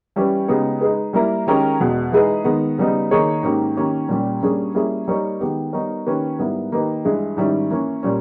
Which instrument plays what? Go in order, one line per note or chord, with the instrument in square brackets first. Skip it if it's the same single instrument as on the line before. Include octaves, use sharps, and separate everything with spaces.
[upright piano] E3 G3 C#4 G4 B4
C#3 G#3 B3 D#4 G4
G#3 D#4 G#4 B4
G3 A#3 E4 A#4
D#3 G#3 C#4 G4 A#4
E2 B2 G#3
E3 G#3 D#4 G#4 B4
D#3 G#3 B3
C#3 G3 B3 D#4
D#3 A#3 D#4 G#4 C#5
G#2 D#3 A#3 C#4 G4
D#3 A#3 C#4 G4
A#2 G3 C#4 G4
G2 G3 A#3 C#4 G#4
G3 A#3 C#4 E4 G#4
G3 A#3 D#4 A#4 C#5
D#3 G#3 B3 G4
G3 B3 D#4 A#4 C#5
D#3 A#3 C#4 G4 B4
G#2 G3 B3 E4 A#4
D#3 A#3 D#4 G4 B4
G2 E3 G#3
G#2 D#3 G3 C#4 E4
E3 A#3 C#4
A#2 G3 C#4